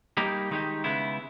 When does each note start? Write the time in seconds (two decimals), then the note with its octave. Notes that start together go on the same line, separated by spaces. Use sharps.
0.17 G3 A#3 D#4 G4 A#4
0.51 D#3 G#3 D#4 G4
0.84 C#3 G#3 B3 E4